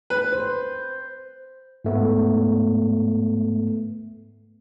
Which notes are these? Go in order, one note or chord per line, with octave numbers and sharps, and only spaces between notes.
B4
C5
G#2 A3 B3